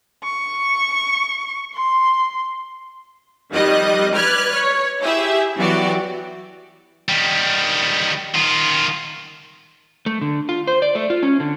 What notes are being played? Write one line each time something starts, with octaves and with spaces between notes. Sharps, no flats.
C#6
C6
F2 D#3 G3 D#5 F#6
B4 D5 F6 F#6 G#6
C#5
E4 G4 G#4 E5
E3 F#3 B3 F#4 G4 D5
D#3 G3
D#3 F4
A3
D3
F4
C5
D5
A3
F4
C#4
D3